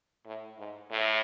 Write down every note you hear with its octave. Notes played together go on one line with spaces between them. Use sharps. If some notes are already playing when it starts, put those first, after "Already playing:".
A2
G#2
A2